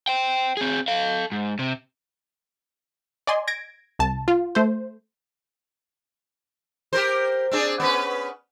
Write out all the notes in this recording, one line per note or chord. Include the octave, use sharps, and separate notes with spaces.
C5 G5
C4 G#4
A4 F5
G#2
C3
D5 D#5 G#5 C6
G#6 A#6 D7
C2 A5
F4
A3 C5
G4 A#4 C5
C4 D4 G#4
B3 C#4 B4